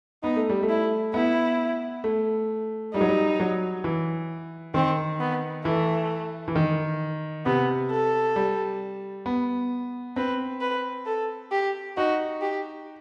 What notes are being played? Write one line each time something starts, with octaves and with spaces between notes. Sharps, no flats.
B3 D#4
A3
G3
A3
E4
B3 E4
A3
G3 D#4
F#3
G3
F#3
E3
D#3 C4
B3
E3 A3
E3
D#3
C3 B3
A4
G3
B3
C4 B4
B4
A4
G4
D#4 F#4
G4